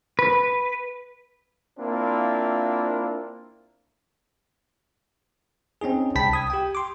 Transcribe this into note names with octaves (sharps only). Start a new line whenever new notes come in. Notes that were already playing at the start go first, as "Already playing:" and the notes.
B4
A#3 C4 D4 E4 F4
C4 C#4 D#4 G#4
C2 G5 A5 B5 B6
D#6 G#6
G4 G5
C6 D6